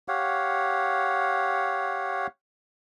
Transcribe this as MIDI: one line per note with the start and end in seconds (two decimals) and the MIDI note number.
0.08 2.27 67
0.08 2.27 73
0.08 2.27 77
0.08 2.27 78